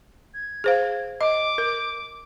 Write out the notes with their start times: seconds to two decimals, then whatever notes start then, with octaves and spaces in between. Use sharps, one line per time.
0.34 G#6
0.64 G#4 C5 F5
1.21 D#5 D6
1.58 A#4